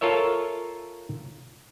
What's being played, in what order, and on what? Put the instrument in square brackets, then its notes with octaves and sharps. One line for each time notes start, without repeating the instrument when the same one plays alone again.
[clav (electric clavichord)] F4 A4 A#4 C#5 E5